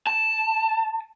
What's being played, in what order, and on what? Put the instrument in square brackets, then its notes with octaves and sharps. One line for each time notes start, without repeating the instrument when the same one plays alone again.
[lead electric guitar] A5